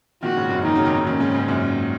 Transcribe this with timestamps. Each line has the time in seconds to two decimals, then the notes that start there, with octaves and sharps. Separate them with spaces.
0.23 A#2 D#3 F#4
0.37 G#2 C#3
0.50 F#2 A#2
0.58 C#3
0.64 A#2 D#3 D#4
0.75 C#3 F#3
0.85 A#2 D#3
0.96 C#3 F#3
1.06 A#2 D#3 C#4
1.20 G#2 C#3
1.35 G#2
1.48 F#2 A#2